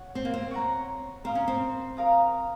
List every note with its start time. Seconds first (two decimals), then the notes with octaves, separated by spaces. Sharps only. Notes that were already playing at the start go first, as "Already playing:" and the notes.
Already playing: C#5 F#5
0.15 C4
0.25 A#3
0.34 C4
0.51 C#5 F#5 A#5
1.24 C4 A#4 F5 A#5 D#6
1.35 C#4
1.48 C4
1.97 A#4 F5 A#5 D#6